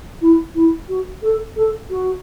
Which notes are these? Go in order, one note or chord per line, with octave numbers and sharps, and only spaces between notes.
E4
E4
F#4
A4
A4
F#4